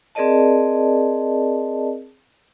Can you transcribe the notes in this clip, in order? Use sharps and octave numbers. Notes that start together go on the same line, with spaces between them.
C4 G#4 A#4 D5 D#5 A5